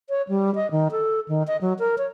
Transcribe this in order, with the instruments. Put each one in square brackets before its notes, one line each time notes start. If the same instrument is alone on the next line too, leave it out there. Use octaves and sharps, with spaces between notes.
[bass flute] C#5
G3
D#5
D#3
A4
D#3
D#5
F#3
A#4
C#5